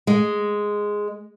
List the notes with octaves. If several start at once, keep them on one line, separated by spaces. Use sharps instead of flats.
G#3